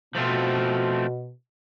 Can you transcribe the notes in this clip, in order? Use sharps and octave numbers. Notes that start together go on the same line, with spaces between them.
B2 F3 A3 C4 F4